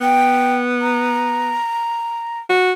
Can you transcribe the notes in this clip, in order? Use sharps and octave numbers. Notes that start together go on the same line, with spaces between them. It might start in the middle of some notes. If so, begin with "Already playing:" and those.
B3 G5
A#5
F#4